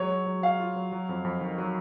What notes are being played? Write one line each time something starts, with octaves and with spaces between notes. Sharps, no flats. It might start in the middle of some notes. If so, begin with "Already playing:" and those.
Already playing: F#3 G#3 C#5
F#3
F#3
F#3 F5
F4
F#3
F#3
F2
F2
D#3
F#3